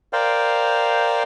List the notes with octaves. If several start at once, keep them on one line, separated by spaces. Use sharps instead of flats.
A#4 C5 D5 F5 G5